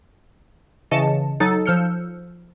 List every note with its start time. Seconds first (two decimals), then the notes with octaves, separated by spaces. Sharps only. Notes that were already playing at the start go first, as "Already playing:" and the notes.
0.91 C#3 E3 D#5 A5 C#7
1.40 F#3 D#4 A4
1.66 F3 E6 F6 G6 C#7